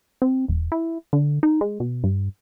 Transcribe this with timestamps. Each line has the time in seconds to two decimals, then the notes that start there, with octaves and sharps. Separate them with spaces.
0.22 C4
0.48 E1
0.72 E4
1.13 D3
1.43 D#4
1.61 G#3
1.80 B2
2.04 G2